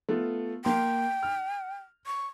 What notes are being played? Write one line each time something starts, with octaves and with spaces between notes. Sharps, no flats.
A3 B3 F4
A#3 G5 C6
F6
C#6